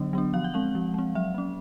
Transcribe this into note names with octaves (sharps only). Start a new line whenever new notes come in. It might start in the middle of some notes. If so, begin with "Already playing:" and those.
Already playing: D3 F#3 B3 D4
F#3 B3 D4
F3 F5
F#5
G#3 C4 F5
F3
G#3 C4
F#3 E5
A#3 C#4